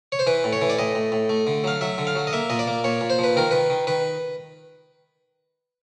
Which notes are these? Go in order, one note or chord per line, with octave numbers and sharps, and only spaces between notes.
C#5
C5
E3 B4
A2
C#5
E3
D5
A2 D#5
A2
A2
A3
D3
F#3 F5
F#3 E5
D3
F5
F#3
D#5
A#3 E5
A#2 D#5
D5
A#3
A#2 C#5
A#2
C5
F3 B4
D#3 A#4
D#3 B4
D#3
D#3 B4